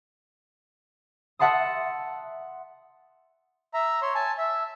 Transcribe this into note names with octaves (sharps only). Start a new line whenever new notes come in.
E5 F#5 A5 C6 D#6
E5 A#5
C#5 C6
G#5 A5
E5